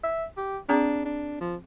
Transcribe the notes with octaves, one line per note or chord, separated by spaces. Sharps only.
E5
G4
C4 D4 G#4 A#5
D4
F3